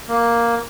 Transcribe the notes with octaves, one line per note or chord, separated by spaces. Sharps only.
A#3